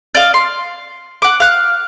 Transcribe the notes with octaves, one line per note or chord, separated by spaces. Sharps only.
D5 D#5 F5
C6
F#5 D6
F5 F#6